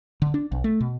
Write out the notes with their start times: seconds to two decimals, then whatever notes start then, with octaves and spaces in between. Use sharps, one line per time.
0.22 D3
0.34 D4
0.52 B1
0.64 A3
0.81 B2